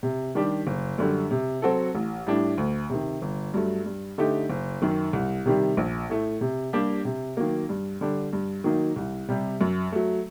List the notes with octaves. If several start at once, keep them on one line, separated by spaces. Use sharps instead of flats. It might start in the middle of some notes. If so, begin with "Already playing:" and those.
C3
D#3 G3 D4 G4
F#1
F#2 D3 G3
C3
F#3 C4 F#4 A4
A1
A2 G3 D4
D2
C3 D#3
G1
G2 F#3 A3
G2
D3 A3 D#4 G4
F#1
F#2 D#3
C2
C3 D#3 G3
A#1
A2 A3
C3
G3 A#3 D4 G4
C3
D#3 F#3 A#3
G2
D3 G3 D4
G2
D#3 F#3 A#3 D#4
C2
C3 G3
F#2
F#3 A3